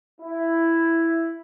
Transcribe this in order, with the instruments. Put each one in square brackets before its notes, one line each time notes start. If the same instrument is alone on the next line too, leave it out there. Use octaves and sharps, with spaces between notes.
[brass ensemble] E4